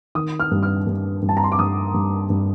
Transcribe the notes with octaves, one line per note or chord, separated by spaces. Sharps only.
D#3 D#6
F6
G2
F6
G2
G2
A5
A#5
C6
D6
G2 D#6
G2
G2